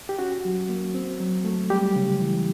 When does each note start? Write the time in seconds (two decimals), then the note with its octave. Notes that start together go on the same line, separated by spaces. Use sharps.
0.09 G4
0.19 C#4 F#4
0.45 F#3
0.69 A#3
0.94 C4
1.20 F#3
1.45 A3
1.70 G3 G4
1.96 C#3
2.21 E3